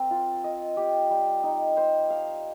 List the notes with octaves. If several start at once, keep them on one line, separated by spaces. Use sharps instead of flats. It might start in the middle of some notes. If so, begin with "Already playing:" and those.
Already playing: C4 A#4
F4
D#5
G4
G3
D#4
C5
F5